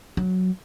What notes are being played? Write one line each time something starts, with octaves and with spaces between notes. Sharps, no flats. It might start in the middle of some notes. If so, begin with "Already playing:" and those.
F#3